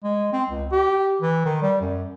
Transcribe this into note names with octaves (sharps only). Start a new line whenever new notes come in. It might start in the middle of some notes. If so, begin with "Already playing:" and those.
G#3
C4
C#2
G4
E3
D#3
G3
F#2